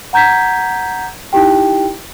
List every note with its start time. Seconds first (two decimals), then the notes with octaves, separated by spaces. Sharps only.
0.13 F#5 A#5 G6 G#6 B6
1.33 D#4 E4 G4 G5